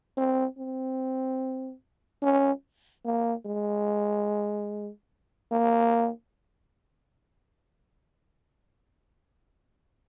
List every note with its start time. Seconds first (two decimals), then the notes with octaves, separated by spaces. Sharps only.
0.17 C4
0.58 C4
2.23 C#4
3.05 A#3
3.46 G#3
5.52 A#3